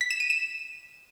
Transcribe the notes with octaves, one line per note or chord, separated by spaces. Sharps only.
B6
E7
D#7
E7